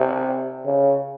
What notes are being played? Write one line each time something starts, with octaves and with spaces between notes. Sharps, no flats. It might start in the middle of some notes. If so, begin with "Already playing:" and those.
Already playing: C3
C#3